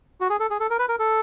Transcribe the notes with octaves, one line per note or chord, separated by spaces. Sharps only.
F#4
G#4
A4
G#4
A4
A#4
B4
A#4
A4